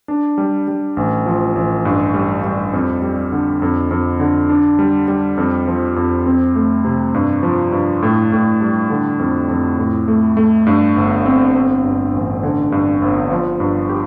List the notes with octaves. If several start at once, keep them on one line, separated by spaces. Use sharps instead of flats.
D4
G3
G3
A1
F3
A1
G2
G3
G3
F2
G3
D3
F2
F2
D3
D4
G3
G3
F2
F3
F2
C4
A3
C3
G2
F3
G2
A2
A2
G3
D3
F2
F2
A2
A3
A3
G2
G1
C4
C4
G2
A1
D3
G2
G1
F3
G2
G4